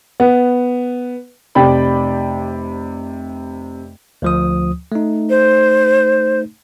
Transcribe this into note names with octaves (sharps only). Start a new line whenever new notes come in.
B3
F1 C3 D5 G5 B5
D2 F3 D#6
A3 D#4
C5